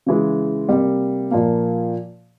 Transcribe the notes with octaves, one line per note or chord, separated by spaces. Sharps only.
C#3 E3 G#3
C3 G3 A#3
A#2 F3 A#3